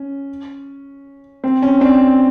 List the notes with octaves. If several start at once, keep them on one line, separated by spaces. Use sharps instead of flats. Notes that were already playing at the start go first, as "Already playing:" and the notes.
Already playing: C#4
C4
C#4
C4 D4